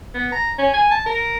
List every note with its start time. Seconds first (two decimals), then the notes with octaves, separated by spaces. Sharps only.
0.15 B3
0.32 A#5
0.58 C#4
0.74 G#5
0.91 A5
1.06 A#4